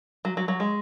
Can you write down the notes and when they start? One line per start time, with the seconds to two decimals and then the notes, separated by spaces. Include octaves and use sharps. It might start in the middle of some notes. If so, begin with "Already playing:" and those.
0.25 F#3
0.37 F#3
0.48 F#3
0.60 G#3